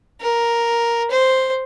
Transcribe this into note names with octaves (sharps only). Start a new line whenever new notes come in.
A#4
C5